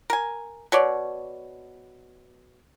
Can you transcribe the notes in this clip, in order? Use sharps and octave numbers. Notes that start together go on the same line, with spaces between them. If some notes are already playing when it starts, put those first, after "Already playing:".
A#4 G#5
B2 C#5 D5